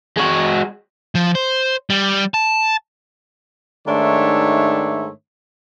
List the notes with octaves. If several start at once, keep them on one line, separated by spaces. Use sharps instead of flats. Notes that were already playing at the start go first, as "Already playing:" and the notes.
G#3 F#4
F3
C5
G3
A5
G#2 D#3 A3 D4 C#5 E5